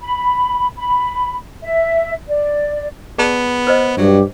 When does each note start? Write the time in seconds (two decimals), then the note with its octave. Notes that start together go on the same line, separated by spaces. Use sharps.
0.01 B5
0.76 B5
1.62 E5
2.28 D5
3.18 B3 G#4 D5 A5
3.67 B4 C5 D#5
3.98 G2 F#3 G4